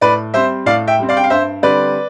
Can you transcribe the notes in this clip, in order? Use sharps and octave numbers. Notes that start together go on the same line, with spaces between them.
A2 B4 D5
G3 C4 C5 E5
A2 D5 F5
E5 G5
G3 C4
D5 F5
G5
F5
G2 C5 E5
D3 G3 C4 B4 D5